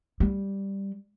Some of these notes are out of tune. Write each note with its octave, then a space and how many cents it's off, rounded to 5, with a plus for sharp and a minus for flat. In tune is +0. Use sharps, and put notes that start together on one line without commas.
G3 +5